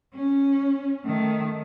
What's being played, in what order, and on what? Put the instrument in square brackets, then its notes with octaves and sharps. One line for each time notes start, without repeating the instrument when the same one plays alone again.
[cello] C#4
D#3 A3